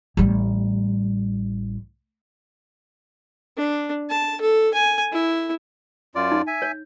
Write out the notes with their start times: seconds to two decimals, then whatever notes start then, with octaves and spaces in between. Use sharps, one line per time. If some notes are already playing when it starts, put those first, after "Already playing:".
0.17 A1 G3
3.57 D4
4.10 A5
4.41 A4
4.74 G#5
5.12 E4
6.15 F#2 F4 D5
6.32 D#4
6.47 E5 G#5
6.62 C#5